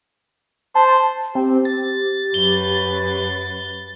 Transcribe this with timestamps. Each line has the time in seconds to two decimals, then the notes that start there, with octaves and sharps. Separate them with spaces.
0.75 C5 A5
1.35 C4 G4
1.65 A6
2.34 F#2 B4 G7